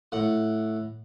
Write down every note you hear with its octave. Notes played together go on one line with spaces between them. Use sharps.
A2 F#5